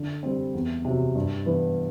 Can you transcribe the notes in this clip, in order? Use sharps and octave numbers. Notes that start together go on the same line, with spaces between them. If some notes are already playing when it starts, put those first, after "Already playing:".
Already playing: D3
G3 C4
E2
C3 F#3
G2
E3 B3